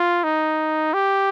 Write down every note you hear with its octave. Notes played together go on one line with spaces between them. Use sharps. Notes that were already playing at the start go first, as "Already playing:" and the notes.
Already playing: F4
D#4
G4